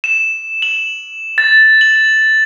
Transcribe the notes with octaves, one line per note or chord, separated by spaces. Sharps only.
E7
F#7
A6
F#7